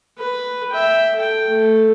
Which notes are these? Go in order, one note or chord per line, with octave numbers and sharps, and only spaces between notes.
B4
E5 G5
A4 G5
A3